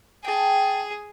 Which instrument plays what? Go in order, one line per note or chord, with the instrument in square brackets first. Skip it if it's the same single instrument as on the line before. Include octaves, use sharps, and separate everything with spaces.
[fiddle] G#4 [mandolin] G5 A5